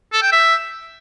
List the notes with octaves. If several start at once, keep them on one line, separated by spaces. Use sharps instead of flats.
A4
G5
E5